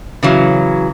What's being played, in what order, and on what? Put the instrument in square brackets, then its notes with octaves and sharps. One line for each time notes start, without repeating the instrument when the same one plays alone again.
[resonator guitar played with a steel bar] C#3 E3 F#3